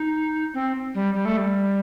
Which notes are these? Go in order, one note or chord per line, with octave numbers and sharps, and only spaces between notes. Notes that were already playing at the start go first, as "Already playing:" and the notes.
Already playing: D#4
C4
G3
G3
A3
G3